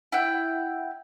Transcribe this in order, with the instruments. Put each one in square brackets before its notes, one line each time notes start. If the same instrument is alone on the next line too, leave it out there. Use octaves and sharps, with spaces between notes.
[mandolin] E4 F#5 G5